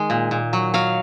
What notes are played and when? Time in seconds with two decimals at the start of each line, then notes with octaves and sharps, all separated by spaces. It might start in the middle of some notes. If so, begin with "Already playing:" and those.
Already playing: D#3 G#3 D#5
0.10 A#2
0.31 A#2
0.53 F#3
0.74 F#3 F5